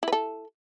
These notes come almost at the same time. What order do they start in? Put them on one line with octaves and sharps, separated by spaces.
E4 B4 A4